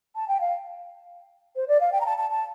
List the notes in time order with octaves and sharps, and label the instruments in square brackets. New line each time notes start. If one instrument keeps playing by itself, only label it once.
[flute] A5
G5
F5
C5
D5
F5
G5
A#5
A5
A5
A5